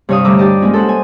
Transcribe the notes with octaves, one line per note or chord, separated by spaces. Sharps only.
G2 C3 C#5 F5 D#6
D2 G3 A#5 D6 E6
D4 G4 D5 D#5
G#3 A#3 C#4 F4
A4 C5 F#5
G#5